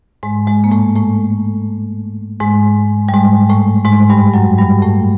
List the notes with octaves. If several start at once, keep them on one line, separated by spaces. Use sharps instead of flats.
G#2 G#3
G#2 G#3
A#3
A2 A3
A2 A3
G#2 G#3
G3
G#2 G#3
A2 A3
G#2 G#3
G2 G3
F#2 F#3
G2 G3
A2 A3